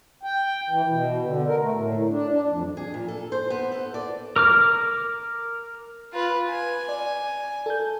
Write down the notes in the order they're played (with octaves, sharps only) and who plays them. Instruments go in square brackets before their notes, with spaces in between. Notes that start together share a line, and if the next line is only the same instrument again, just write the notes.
[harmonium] G5
E3
B2
D3
A#4
A3
A2
D4
D4
F2
[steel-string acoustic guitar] G#4
A#2
A4
C5
B3
A4
D5
[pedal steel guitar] A#4 D6 F6
[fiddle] F4 B4
G#5
[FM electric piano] D5
A4 G6